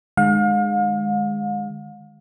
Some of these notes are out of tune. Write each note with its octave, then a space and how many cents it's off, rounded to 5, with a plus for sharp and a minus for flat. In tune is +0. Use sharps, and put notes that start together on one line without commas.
D#3 -45 G#3 +0 F5 +40